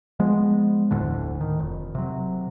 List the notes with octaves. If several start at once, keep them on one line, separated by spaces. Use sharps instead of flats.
F3 G#3 B3
F1 D2 A2 D3
D#3
F1
C3 F#3